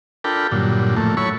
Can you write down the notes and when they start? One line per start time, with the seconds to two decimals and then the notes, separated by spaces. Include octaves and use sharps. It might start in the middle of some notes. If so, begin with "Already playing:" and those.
0.24 D4 F4 A4 A#4 G5 B5
0.51 G2 A#2 D3 F#3
0.96 F2 A2 A3 A#3
1.17 F#3 E4 A4 C#5 B5 C#6